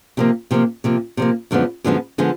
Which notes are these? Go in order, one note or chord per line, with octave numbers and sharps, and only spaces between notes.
C3 F3 A#3
C3 F3 A#3
C3 F3 A#3
C3 F3 A#3
F#2 D3 F3 G#3 B3
F#2 D3 F3 G#3 B3
D3 F3 G#3 B3